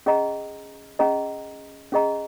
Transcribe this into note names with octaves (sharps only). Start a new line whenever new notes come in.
C#4 G#4 D#5 A#5
C#4 G#4 D#5 A#5
C#4 G#4 D#5 A#5